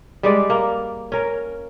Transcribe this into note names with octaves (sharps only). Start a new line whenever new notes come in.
G3 G#3 D5
A#3
C#4 A#4